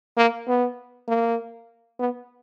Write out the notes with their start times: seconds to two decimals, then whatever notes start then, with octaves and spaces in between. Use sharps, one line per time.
0.17 A#3
0.47 B3
1.08 A#3
1.99 B3